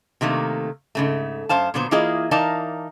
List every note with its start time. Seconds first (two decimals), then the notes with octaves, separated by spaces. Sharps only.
0.21 C3 D#3 A3 A#3
0.95 G#2 C#3 A3
1.49 F#2 C5 F5 A5
1.74 A#2 D3 F#3 B3 C5
1.91 E3 A#3 E4 F4 G#4 D#5
2.31 E3 D#4 A#4 D5 F5 A5